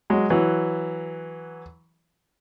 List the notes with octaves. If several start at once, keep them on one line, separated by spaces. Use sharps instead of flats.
F#3 G#3
E3 F#3